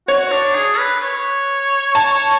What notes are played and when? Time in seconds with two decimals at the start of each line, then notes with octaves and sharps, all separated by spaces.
0.08 F#4 C#5
0.31 D4
0.55 G#4
0.78 B4
1.01 C#5
1.95 A5